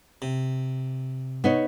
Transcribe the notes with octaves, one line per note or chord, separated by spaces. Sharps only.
C3
B3 D#4 C#5